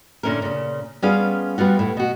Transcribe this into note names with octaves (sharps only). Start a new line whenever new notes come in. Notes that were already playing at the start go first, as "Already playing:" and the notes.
A#2 D3 C#4 E4 A#4
A#2 C#3
G3 B3 C#4 F4 G#4 F5
G3 B3 F4 F#4
A2
B2 F#4